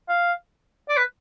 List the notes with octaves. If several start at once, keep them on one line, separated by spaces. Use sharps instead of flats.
F5
D5
B4